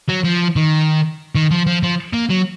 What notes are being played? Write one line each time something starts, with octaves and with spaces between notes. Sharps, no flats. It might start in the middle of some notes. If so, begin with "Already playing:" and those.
F#3
F3
D#3
D#3
F3
F3
F3
A#3
F#3